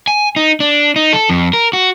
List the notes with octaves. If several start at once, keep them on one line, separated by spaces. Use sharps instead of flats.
G#5
D#4
D4
D#4
A4
F2
A#4
F#4